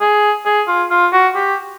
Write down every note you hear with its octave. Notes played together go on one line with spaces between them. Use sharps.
G#4
G#4
F4
F4
F#4
G4